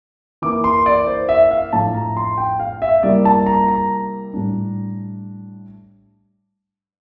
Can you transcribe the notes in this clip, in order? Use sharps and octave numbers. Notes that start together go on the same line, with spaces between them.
E3 A#3 E4 D6
C6
D5
C5
E5
F5
A2 F3 A3 D4 A5
A#5
C6
G5
F5
E5
C3 G3 A#3 E4 D5
A5
A#5
A#5
A2 G3 D4